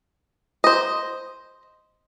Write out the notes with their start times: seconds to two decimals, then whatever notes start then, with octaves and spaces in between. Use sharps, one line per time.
0.64 C5 D#5